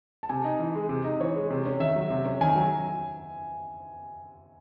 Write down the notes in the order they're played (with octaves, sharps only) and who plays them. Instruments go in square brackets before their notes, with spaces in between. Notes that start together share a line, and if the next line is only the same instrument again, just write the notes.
[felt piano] A5
[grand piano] C3 [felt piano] G#5
[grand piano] D#4
E3
G#3
C3
D#4
[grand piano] E3 [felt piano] C#5
[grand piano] G#3
C3
C#4
[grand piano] D#3 [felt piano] E5
[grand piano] F#3
C3
C#4
[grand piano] D#3 [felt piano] G#5
[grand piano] F#3